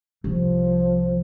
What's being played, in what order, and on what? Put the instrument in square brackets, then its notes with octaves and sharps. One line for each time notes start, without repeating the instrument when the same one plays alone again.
[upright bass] C2 [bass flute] F3